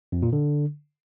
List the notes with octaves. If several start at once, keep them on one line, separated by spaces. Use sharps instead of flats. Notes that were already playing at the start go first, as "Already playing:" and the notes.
F2
A#2
D3